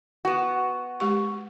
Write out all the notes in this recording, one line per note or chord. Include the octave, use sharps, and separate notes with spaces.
B3 F#4
G#3 G4 C#6